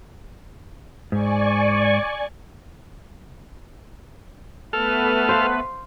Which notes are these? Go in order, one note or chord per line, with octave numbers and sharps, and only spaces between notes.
G#2 D5 G#5 C#6
A3 B3 A4 B4 F6
C5 F5